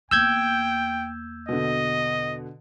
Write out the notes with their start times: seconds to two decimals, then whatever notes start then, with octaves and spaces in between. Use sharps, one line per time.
0.11 E2 A#3 G5 E6 G6 G#6
1.49 B2 D3 D#5